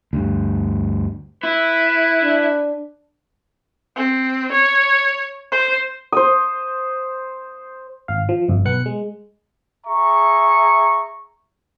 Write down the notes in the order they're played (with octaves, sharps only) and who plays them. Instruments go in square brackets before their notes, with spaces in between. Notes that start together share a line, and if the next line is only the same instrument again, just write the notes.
[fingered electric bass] D2 G2
[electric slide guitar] E4 [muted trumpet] B4
[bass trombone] D4
[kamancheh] C4
C#5
C5
[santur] C5 D#6
[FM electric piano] G#1 F5
F3
G1 F2
B1 B3 F#6 C#7
G#3
[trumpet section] G#4 E5 A#5 C#6